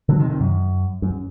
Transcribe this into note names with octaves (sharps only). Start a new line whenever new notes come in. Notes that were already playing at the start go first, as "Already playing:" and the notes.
D3 F#3
C3 D#3
C3 D#3
F#2
F#2